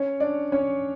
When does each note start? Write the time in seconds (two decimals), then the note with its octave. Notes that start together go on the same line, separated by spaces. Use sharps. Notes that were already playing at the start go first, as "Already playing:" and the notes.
Already playing: C#4 C#5
0.20 D4 D5
0.52 C#4 C#5